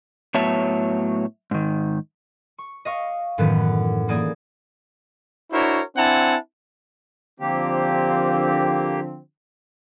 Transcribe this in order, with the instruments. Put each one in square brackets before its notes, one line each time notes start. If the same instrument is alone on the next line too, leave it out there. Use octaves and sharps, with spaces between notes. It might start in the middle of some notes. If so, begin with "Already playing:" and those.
[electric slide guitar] A2 F#3 B3 C#5 E5 A5
G#2 D#3
[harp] C#6
D#5 F5 C#6
F#2 A2 D#3 E3 B3
E3 A#3 G#4 D5 D#6 G#6
[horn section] D4 E4 F#4 A#4 C5 C#5
C4 D4 E4 F#5 G#5 A5
[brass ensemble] D3 F3 C4 [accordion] A#3 G4